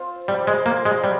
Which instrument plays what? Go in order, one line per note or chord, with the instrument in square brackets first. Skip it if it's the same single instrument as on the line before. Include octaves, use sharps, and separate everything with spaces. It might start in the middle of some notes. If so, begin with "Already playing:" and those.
Already playing: [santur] C4 F4 C5
[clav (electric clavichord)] G3 [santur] C4
[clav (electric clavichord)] G#3
[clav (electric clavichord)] A#3 [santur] C5
[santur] F4
[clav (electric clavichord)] G#3
[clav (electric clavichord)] G3 [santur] C4